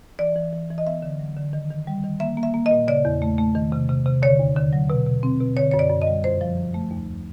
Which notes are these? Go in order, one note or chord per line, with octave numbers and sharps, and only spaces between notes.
E3 D5
E3
E3
E3
D#5
B3 E5
D3
F#3
D3
D#3
D#3
G3
D#3
A#3 E5
A#3
E5
A#3
D#5
A#2
C#3 D5
E2
A3
A3
D#3
C3
C3
C3
D3 C#5
D#2
D3
F#3
B2
B2
C4
B2
D3 C#5
F#2 C#5
D5
F#2
D#5
G3
F2 C5
F3
F2
A3
D#2